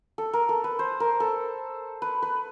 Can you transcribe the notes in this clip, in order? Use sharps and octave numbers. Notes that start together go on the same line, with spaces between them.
A4
A#4
A4
B4
C5
A#4
A4
B4
B4